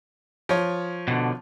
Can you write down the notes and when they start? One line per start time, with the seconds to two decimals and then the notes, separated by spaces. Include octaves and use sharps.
0.49 F3 C#5
1.08 B2 D3